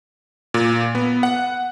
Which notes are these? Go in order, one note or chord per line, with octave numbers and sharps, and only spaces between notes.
A#2
B3
F#5